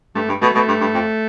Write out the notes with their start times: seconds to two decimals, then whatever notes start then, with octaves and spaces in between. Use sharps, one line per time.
0.15 G2 A3
0.28 G2
0.42 B2 A3
0.55 B2 A3
0.68 G2
0.81 G2
0.94 F2